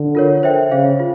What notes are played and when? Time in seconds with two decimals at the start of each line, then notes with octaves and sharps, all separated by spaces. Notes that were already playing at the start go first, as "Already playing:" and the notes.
Already playing: D3
0.15 F4 A#4 C#5
0.43 C5 E5 G5
0.71 C#3 G#4 C5 F5
0.99 F4